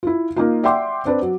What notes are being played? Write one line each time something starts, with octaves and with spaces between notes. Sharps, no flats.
E4 F4
A#3 D#4 F4
D5 E5 F#5 G5 C6 D6
C4 D4 B4
F#3